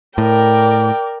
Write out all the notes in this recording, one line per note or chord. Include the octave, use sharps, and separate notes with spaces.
A2 A#4 D5 G5